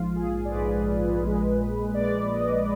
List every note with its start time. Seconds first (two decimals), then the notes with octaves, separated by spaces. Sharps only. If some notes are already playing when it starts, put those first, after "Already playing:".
Already playing: A#1 G#2 F3 F4
0.16 G#4
0.45 D5
0.51 A#1 G#2 F3 B4
1.23 A#1 A#2 G#3
1.94 A#1 A#2 G#3 D5
2.31 D#5